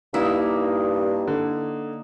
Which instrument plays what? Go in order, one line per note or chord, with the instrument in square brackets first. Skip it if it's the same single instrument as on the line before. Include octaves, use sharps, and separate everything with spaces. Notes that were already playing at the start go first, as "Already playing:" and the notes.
[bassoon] G2 [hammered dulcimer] A#3 D#4 [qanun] E4
[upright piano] D3